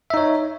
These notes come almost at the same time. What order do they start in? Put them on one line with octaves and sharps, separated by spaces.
E5 D#4 C#5